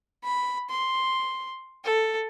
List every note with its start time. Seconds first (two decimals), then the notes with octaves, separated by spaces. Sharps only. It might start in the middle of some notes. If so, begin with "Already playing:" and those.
0.23 B5
0.70 C6
1.84 A4